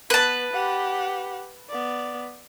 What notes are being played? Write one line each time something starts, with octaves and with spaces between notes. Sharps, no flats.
B3 B4 A5
G4 F#5
B3 D5